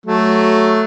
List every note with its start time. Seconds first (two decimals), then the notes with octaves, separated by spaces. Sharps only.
0.06 F#3 A3